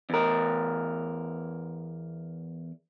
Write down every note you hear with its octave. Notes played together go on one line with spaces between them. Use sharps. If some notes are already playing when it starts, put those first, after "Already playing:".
E2 A#4